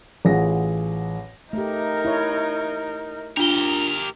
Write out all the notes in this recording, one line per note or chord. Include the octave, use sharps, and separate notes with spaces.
A1 F4 G#4 F#5 A#6
A3 D#4 G4 A#4
E4 C#5
D4 F4 G4 A#4 G7